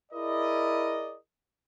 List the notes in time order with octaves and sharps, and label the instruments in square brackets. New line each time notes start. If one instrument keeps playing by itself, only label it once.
[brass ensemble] E4 G#4 A#4 D5 D#5